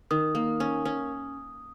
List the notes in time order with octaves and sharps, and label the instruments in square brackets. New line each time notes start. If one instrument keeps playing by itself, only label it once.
[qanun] D#3 [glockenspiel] D#6
[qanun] A#3
C#4
C#4